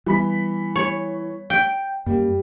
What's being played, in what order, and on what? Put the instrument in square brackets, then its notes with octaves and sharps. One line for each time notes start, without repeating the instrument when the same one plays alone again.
[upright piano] E3 B5 B6 [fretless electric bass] G3 B3
[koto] C#5
G5
[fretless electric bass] F#2 A#3 [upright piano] G3